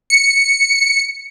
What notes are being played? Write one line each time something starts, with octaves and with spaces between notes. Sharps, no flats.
C#7